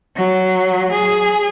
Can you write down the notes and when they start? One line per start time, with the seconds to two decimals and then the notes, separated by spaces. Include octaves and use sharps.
0.16 F#3
0.92 G#4